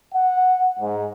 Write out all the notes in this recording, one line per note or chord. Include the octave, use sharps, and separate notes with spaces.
F#5
G#2